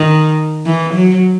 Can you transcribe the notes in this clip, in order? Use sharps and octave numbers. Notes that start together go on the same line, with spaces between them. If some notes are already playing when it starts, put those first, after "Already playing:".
Already playing: D#3
E3
F#3